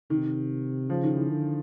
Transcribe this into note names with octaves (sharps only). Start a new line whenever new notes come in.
C3 D#3
C#3 F3
D#3
E3
D3